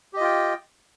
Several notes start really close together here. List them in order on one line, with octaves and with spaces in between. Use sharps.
G4 D#5 F4 G5